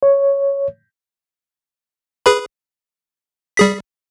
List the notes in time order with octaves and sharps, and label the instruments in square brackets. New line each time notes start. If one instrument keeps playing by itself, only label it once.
[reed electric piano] C#5
[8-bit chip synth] G#4 B4 B5
G3 G#4 B6